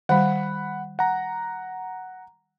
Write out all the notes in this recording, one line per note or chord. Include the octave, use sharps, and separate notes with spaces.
D#3 G3 F#5 B5
F#5 A#5